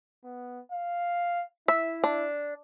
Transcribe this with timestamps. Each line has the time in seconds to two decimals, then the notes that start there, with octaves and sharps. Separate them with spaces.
0.24 B3
0.72 F5
1.68 E4 E5
2.04 D4